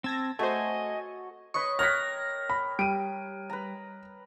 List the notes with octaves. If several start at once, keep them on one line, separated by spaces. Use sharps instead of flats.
C4 A5 E6 G#6 A#6
A3 F#4 A4 C5 C#5 D#5 G#5
B4 C#5 D#5 C#6
A#4 C#5 G5 F6 F#6 A#6 B6
B5
G3 D7 D#7
B4 A#5